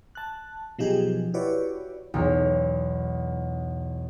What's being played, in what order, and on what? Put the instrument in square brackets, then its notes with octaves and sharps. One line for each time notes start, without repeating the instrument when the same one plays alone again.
[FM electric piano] A5 F#6
B2 F3 F#3 D#4 G4 G#4
E4 F#4 G4 B4 C#5 D5
[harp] B1 E2